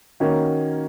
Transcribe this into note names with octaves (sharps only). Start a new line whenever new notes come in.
D#3 A#3 C#4 F#4